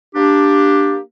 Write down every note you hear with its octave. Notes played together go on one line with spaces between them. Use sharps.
A#3 D4 G4